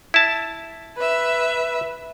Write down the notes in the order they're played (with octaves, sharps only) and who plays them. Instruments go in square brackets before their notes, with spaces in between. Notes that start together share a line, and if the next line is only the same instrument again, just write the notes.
[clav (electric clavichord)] E4 A5
[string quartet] B4 E5